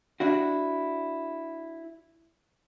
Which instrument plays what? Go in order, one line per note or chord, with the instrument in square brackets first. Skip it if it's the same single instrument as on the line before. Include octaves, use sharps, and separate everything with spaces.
[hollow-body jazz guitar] D4 E4 F#4